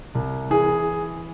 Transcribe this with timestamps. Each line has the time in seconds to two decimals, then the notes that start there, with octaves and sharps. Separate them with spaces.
0.15 C2
0.50 E3 G#4